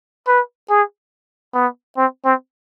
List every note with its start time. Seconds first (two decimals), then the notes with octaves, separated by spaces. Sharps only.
0.27 B4
0.70 G#4
1.54 B3
1.97 C4
2.25 C4